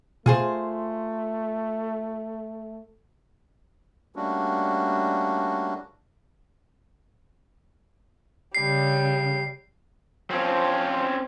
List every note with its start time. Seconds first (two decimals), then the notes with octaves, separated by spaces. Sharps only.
0.26 B2 A3 F4 G#4 C5
4.16 G3 A3 A#3 C#4 D4 F#4
8.55 C#3 G3 C7
10.31 F3 C4 C#4